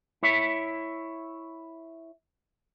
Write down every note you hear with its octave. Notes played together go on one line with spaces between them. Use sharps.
E4 C#5 E5